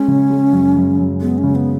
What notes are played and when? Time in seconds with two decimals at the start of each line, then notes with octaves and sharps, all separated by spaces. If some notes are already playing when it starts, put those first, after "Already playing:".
Already playing: G#3 C#4
0.08 C#3
0.30 G#3
0.52 F#2
0.76 F#2
0.99 F#2
1.21 G#3 B3
1.38 C#4
1.44 C#3
1.55 B3